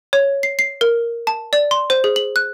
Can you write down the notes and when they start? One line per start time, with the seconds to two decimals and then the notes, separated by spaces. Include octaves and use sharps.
0.13 C#5
0.43 C7
0.59 C7
0.81 A#4
1.27 A5
1.53 D5
1.71 C6
1.90 C5
2.04 G#4
2.16 F#7
2.36 F#6